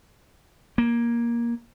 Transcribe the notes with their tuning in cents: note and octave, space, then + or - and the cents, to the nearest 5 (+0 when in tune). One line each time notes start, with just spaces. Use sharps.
A#3 +15